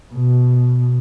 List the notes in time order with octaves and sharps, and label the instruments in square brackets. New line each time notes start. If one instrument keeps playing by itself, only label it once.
[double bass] B2